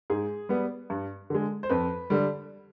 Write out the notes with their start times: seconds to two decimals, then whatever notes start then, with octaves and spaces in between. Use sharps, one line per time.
0.10 G#2 G#4
0.49 G3 B3
0.90 G2
1.30 D3 G#3
1.63 C5
1.69 F2 B4
2.10 D3 G3